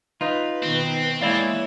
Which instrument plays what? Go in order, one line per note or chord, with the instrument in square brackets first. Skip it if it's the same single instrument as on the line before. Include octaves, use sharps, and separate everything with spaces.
[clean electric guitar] D#4 F4 [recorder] B4
[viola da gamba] B2 D#3 [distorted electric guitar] C4
[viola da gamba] E3 A#3 C#5 [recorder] G#3 [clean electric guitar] E4 D5 F5